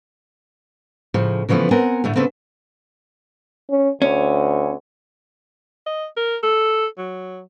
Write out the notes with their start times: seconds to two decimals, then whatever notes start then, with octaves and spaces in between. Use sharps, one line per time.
1.14 A2 C#3 F3
1.49 C#3 E3 F3 A3 B3
1.71 B3 C4 A#4 F#5 G#5
2.04 A2 D3 A3
2.16 C#3 A3 B3 C4
3.70 C#4
4.02 D2 C#4
5.86 D#5
6.17 A#4
6.43 A4
6.98 F#3